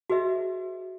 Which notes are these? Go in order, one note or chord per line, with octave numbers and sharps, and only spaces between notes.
F#4 G#4 B4 D#5 E5